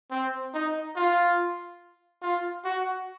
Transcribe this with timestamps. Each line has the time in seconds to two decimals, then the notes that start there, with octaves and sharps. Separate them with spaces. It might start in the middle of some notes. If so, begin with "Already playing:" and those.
0.11 C4
0.54 D#4
0.96 F4
2.22 F4
2.64 F#4